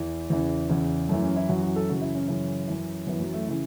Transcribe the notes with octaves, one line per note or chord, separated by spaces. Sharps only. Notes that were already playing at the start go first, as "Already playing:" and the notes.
Already playing: E2 E3
E2 C#3 E3
E2 C#3 E3
F#2 E3 A3
C#4
E4
F#2 E3 F#4
F#4
A4
F#2 C#3 E3 F#4
E4
C#4
F#2 C#3 E3
F#2 E3
F#2 E3 B3
F#3
A3
C#3 E3 E4